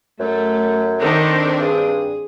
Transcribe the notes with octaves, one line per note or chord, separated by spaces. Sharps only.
F#2 A3 A4
D#3 C4 D4 A4
G2 G#4